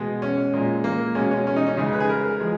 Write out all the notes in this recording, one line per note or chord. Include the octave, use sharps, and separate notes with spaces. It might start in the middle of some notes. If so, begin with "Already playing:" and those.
Already playing: B2 G#3
C#4
A#2 G#3
A#3
B2 G#3 C#4
C#4
C#4
D#4
C#4
C#3 G#3 D#4
B4
G#4
A#4
F3 G#3